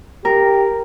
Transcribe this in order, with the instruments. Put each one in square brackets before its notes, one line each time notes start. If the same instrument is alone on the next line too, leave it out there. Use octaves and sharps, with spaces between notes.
[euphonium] G4 [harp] A#4